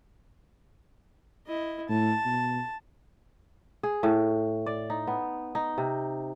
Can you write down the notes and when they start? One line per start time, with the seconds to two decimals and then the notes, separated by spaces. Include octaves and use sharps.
1.47 E4 D#5
1.89 A2 A5
2.25 B2
3.83 G#4
4.03 A2
4.66 D5
4.90 D#4
5.07 B3
5.55 D#4
5.78 C3